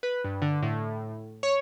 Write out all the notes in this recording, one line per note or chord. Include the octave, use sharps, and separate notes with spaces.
B4
G2
D3
A2
C#5